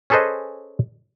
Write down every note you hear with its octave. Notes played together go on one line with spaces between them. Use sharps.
C#4 G#4 A4 B4 C5 D#5